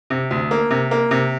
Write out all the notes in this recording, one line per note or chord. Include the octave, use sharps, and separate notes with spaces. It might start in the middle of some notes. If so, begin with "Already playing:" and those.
C3
D2
A#3
C3
A#3
C3